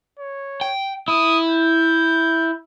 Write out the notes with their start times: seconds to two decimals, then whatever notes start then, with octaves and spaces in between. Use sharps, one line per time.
0.19 C#5
0.61 G5
1.08 E4 D#6
1.49 G6